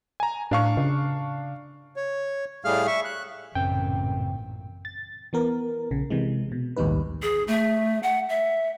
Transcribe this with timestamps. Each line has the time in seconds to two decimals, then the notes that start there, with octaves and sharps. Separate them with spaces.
0.20 G#5 A#5
0.51 A2 D4 F5 C#6
0.77 C#3
1.96 C#5
2.65 A2 G3 A3 G#4 F5 F6
2.87 E5 C#6
3.05 F#6
3.55 A1 F#2 A#2 C#3 C4 G5
4.85 A6
5.33 E3 B3 A#4
5.91 A#1 C#3
6.10 C3 E3 G#3
6.52 B2
6.76 A#1 D#2 G#2 G3 D#4 B4
7.22 G#4
7.48 A3
8.03 F#5
8.29 E5